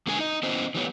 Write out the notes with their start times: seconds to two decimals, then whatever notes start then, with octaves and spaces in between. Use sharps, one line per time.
0.07 B2 D3 G#3 B3 F4 G#5
0.19 D#4 D#5
0.43 B3 C#4 E4 C5 D#5
0.75 E3 G3 B3 C#5